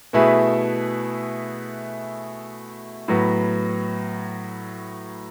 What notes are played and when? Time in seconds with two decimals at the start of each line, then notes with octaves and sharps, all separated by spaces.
0.13 B2 A3 E4 G#4 B4
3.08 A2 F#3 B3